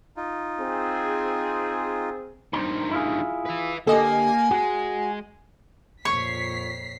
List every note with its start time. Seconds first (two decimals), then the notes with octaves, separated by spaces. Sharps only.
0.17 D#4 F4
0.60 C4 G#4
2.53 G2 D#3 C5 A#5
2.92 E4 F4 G#4
3.45 B4 E5
3.87 D3 A#3 G4 A4 D#5 G#5
4.51 G#3 F#4
6.05 F2 A#2 C#5 C#6 B6 C7